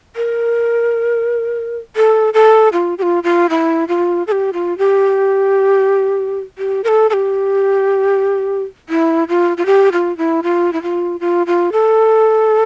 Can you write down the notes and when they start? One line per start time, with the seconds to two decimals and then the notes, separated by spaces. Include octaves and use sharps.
0.16 A#4
1.96 A4
2.34 A4
2.73 F4
2.98 G4
3.02 F4
3.24 F4
3.50 E4
3.88 F4
4.27 A4
4.32 G4
4.53 F4
4.78 G4
6.58 G4
6.84 A#4
6.88 A4
7.10 A4
7.13 G4
8.89 E4
9.29 F4
9.57 F4
9.66 G4
9.93 F4
10.17 E4
10.43 F4
10.73 E4
10.83 F4
11.20 F4
11.47 F4
11.72 A4